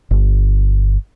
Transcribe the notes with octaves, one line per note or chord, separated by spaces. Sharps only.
G1